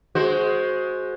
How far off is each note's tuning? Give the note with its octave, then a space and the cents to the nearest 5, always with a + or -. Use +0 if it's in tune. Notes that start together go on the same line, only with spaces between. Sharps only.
G#3 +15 F#4 +0 C5 +0